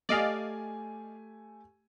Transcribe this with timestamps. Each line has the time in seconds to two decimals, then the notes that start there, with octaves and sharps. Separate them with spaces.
0.09 A3 G4 D5 D#5 F5 G#5